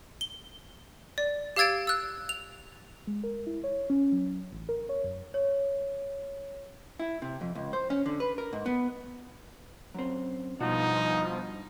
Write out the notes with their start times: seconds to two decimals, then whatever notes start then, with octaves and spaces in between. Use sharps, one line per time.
0.21 G7
1.18 D5
1.56 G4 F5 E6 G#6 A6 D7
1.87 E6 F#6
2.29 F7
3.07 G#3
3.23 A#4
3.47 E4
3.64 C#5
3.90 C#4
4.12 F#3
4.52 A1
4.69 A#4
4.89 C#5
5.04 F#2
5.34 C#5
6.99 E4
7.22 C3
7.41 F2
7.55 C#2
7.73 C5
7.90 C#4
8.06 D3
8.20 B4
8.38 A#4
8.53 G#2
8.66 B3
9.94 F#2 C4
10.60 G2 B2 F3 D#4 F#4